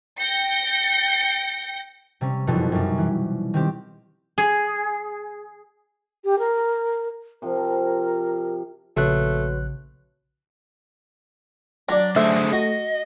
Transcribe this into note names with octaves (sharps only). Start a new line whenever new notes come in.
G5 G6 A#6 C#7
C3 G3 C#4
F#1 F2 B2 G3 D#4
F#2 G3
E3
D#3 C4 G4
G#4
G4
A#4
C3 F3 A#4
A#1 C#3 A3 F#4 B4 C#5 F#6
F#3 D4 D5
D3 A3 G#4 C5 E5
F#4 D#5